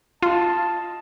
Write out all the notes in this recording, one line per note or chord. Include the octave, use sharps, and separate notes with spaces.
F4 D#5 A5